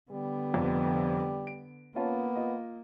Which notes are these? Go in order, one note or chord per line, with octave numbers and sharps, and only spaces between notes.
D3 G3 B3
F1 F2
D7
A#3 B3 C#4 F4 A5
F4 D#5